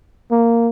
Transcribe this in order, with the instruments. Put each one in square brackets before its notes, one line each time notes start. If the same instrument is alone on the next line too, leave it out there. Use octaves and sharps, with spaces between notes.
[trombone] A#3